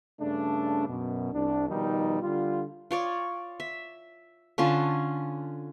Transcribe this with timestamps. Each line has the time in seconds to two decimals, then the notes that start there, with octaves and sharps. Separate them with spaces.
0.21 G2 C#3 A3 D4
0.88 F#2 B2
1.33 C2 D4
1.69 B2 D#3 F3 G3 D#4
2.22 D3 G3 F4
2.91 F4 C#5 D5
3.60 E5
4.58 D3 C#4 F4 A5